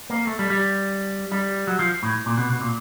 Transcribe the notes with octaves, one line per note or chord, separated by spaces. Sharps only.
A#3
A3
G3
G3
G3
F#3
F3
A2
A#2
B2
B2
A#2